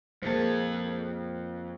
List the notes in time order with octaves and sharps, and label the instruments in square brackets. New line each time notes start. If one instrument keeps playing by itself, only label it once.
[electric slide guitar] F2 D4 A5 [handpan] G#3 A#3 [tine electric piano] C5 C#7